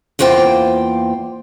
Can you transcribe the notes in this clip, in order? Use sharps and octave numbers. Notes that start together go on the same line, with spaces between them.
E2 A#3 F4 C5 G5